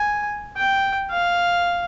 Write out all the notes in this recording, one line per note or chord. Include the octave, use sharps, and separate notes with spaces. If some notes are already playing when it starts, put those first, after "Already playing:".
Already playing: G#5
G5
F5